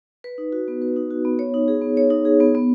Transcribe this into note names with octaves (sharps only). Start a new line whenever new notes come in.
B4
D#4
F#4
B3
B4
D#4
F#4
B3
C#5
D#4
G#4
B3
C#5
D#4
G#4
B3
B3